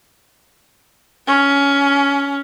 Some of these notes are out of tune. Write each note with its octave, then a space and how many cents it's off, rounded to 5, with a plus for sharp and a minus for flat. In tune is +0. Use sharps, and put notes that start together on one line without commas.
C#4 +15